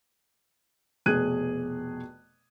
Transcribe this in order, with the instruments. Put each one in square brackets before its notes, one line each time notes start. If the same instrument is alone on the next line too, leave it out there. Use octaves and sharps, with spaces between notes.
[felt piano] F1 B2 G#4 F#6 G#6 D#7